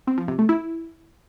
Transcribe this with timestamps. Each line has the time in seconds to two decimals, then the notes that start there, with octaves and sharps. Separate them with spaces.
0.07 C4
0.18 F3
0.28 C3
0.39 A3
0.49 E4